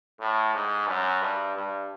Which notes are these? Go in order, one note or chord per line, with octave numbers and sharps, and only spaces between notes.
A2
G#2
F#2
G2
G2